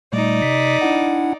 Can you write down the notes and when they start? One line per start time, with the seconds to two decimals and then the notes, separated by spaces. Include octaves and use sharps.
0.13 A#2 G3 A3 D#4 D5
0.42 C3 B6
0.81 D4 E4 F#5